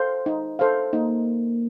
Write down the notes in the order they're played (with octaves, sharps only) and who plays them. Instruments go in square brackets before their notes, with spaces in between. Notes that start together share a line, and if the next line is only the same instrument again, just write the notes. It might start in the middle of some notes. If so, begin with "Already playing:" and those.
Already playing: [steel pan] A4 C5 F5
D#4
A4 C5 F5
[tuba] A#3 [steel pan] D#4